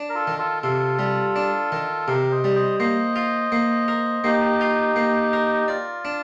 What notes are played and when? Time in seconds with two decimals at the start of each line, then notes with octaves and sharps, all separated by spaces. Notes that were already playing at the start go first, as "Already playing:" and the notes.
Already playing: D4
0.10 A#4
0.15 F4 A4
0.27 D#3
0.39 F4 A4
0.63 C3 F4 A4
0.99 G3
1.36 D4
1.72 D#3
2.07 C3 G4 A#4
2.31 C5 D#5
2.44 G3
2.56 C5 D#5
2.79 A#3 C5 D#5
3.16 F4
3.52 A#3
3.88 A#4
4.24 A#3 D#4 G4
4.61 F4
4.96 A#3
5.33 A#4
5.68 F4 D5
6.05 D4